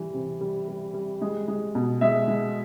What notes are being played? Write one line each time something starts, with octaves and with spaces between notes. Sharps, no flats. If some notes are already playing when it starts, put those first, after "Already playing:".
Already playing: E3 G3
C3
G3
G3
G3
G#3
G#3
B2
G#3 E5
G#3